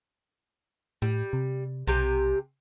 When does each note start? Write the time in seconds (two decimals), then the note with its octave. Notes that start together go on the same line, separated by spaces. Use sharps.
1.02 A2 G3
1.33 C3
1.87 B1 C3 G4 G#5